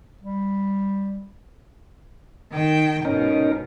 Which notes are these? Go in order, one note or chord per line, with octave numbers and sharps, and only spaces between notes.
G3
D#3 G5
G#2 B2 C#4 D#4 A#4